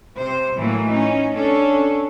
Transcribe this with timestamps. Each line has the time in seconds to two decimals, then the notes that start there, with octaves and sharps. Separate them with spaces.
0.16 C3 C5
0.56 A2 E3 F#3 A#3
0.89 C#4 D#4
1.34 C#4 D4 A4